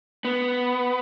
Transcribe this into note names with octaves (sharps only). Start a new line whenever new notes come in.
B3